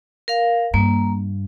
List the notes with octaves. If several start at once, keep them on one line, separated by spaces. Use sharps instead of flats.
A#4 F5
G2 A#3